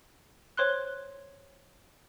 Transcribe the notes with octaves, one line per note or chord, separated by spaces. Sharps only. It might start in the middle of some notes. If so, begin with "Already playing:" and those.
C5 C#5 C6 F#6